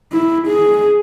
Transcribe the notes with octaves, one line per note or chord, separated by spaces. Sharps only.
E4
G#4